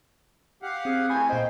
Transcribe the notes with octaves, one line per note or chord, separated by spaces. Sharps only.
G4 F5 F#5
C4 G#4
E3 A3 C4 G#5 B5 G6 G#6
A#2 A#3 C5 D#5 G5